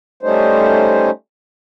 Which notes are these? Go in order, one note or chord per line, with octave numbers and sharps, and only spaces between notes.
G3 A3 C#4 D#4 C5